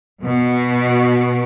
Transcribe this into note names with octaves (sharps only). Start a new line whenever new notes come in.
B2